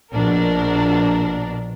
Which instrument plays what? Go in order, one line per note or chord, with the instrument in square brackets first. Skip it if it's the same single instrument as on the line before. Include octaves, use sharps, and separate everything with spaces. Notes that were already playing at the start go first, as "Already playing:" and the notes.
[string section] A#1 B2 D4 A#4